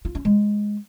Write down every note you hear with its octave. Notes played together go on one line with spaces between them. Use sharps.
F4
C#4
G#3